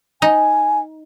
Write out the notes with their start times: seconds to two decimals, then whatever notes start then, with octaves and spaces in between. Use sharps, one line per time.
0.22 D#4 G#5